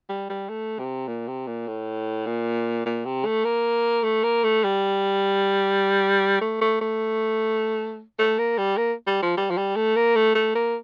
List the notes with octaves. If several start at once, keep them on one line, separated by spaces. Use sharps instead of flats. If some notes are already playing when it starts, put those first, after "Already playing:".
G3
G3
A3
C3
A#2
C3
A#2
A2
A#2
A#2
C3
A3
A#3
A3
A#3
A3
G3
A3
A3
A3
A3
A#3
G3
A#3
G3
F3
G3
F3
G3
A3
A#3
A3
A3
A#3